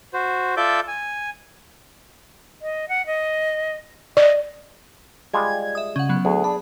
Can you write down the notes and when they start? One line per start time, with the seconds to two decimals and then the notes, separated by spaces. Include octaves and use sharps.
0.14 F#4 C5
0.57 F4 A4 D5 E5 D6 G6
0.88 G#5
2.62 D#5
2.89 F#5
3.06 D#5
4.17 D5 D#5
5.34 G3 G#3 F4 G#6
5.75 E5 D#6
5.96 C#3 C#4 F#5
6.09 F#3 B3
6.25 D2 G#4
6.44 D4 B5